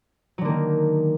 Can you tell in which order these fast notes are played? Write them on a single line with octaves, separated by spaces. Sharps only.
F#3 D3 A#3 D#3